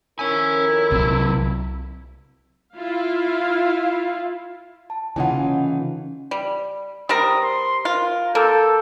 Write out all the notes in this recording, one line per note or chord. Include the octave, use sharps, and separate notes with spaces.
F2 D#3 E4 A#4 C#5 G#5
C2 C3 F#3
E4 F4 F5
A5
C#3 E3 A#3 C#4 D#4 F4 F#5 G#5
G3
G3 C4 A#4 D#6
C6
F4 A#4
A#3 A4 G6